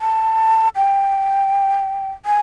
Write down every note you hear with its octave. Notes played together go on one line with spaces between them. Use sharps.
A5
G5
G#5